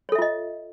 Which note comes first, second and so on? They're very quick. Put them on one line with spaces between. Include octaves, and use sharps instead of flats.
C#5 A4 E5 F4 D#5